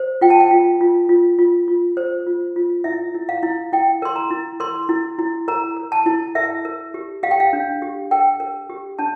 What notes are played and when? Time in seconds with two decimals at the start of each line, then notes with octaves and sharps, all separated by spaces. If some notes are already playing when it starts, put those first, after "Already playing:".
Already playing: C5
0.21 F4 G5
0.30 A5
0.40 G5
0.51 F4
0.81 F4
1.09 F4
1.39 F4
1.68 F4
1.97 C5
2.27 F4
2.56 F4
2.84 E4 E5
3.15 E4
3.29 F5
3.43 E4
3.73 E4 G5
4.02 A#4 C6
4.16 A#5
4.31 E4
4.60 A#4 C6
4.89 E4
5.19 E4
5.48 A#4 A#5
5.77 A#4
5.92 A5
6.06 E4
6.35 A#4 E5
6.65 A#4
6.94 G4
7.23 G4 F5
7.31 G5
7.40 F5
7.53 D4
7.82 G4
8.11 A#4 G5
8.40 A#4
8.70 G4
8.99 D4 A5